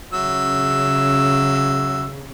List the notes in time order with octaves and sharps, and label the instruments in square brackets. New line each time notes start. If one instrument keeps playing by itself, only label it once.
[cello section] C#3 [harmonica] F#3 E5 E6